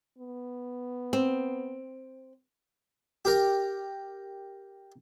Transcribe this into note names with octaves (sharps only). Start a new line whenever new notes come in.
B3
C4
G4 A#4